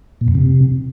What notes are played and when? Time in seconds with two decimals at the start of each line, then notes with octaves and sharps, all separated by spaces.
0.21 A#2
0.28 F2
0.35 C3